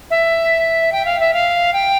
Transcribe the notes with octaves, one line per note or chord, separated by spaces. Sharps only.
E5
G5
F5
E5
F5
G5